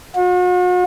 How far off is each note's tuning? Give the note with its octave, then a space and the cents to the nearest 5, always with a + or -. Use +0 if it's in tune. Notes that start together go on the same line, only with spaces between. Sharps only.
F#4 -45